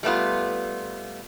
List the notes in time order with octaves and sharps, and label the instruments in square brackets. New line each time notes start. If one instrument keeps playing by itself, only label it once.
[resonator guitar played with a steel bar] G3 A3 B3 F4